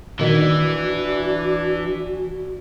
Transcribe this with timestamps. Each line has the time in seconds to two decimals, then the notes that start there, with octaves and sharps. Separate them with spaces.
0.19 A#2 D#3 E3 D4 F#4